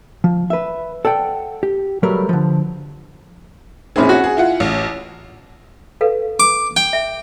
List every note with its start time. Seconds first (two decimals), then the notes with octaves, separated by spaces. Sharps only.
0.24 F3
0.50 B4 E5
1.05 A4 D5 F#5 G5
1.63 G4
2.03 F#3 G3 A3 A#4 B4
2.29 D3 F3
3.96 A#1 C4 C#4 E4 G#4
4.09 F#4
4.24 G#4
4.37 E4 F4 F#5
4.60 A1
6.01 A4 B4 F5
6.40 D6
6.77 G5
6.93 E5